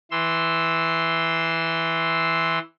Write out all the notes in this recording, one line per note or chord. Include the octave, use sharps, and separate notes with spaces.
E3 C6 E6